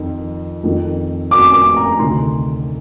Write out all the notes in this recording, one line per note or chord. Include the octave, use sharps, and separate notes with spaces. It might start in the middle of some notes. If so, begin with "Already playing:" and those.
Already playing: F2 D#3
F2 D#3
D6
D6
A#5
D2 C3 D#3 C6